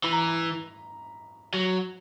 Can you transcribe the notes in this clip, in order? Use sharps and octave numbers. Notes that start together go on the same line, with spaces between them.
E3 B5
A#5
B5
F#3